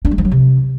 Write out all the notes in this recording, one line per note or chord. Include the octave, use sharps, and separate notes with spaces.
D4
G#3
F3
F#3
C3